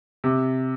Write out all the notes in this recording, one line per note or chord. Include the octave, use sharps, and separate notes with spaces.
C3